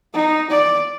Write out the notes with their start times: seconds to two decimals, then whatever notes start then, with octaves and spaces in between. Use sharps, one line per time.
0.14 D#4
0.51 D5